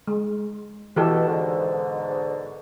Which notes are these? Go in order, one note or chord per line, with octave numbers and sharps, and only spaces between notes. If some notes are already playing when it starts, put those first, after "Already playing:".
G#3
B2 E3 G4 A4
G#2 B2 D3